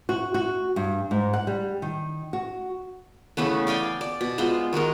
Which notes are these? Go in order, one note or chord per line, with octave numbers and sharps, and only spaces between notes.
F#4
F#4
G2
G#2
F#5
G3
D#3
F#4
C#3 E3 A3 B3
D5 F5 G5 G#5
D5
B2
G#3 B3 F4 C5
D#3 G#3 F#4 A#4